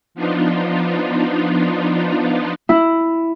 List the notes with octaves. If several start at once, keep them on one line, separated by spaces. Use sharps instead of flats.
F3 B3 D4 D#4 F4
E4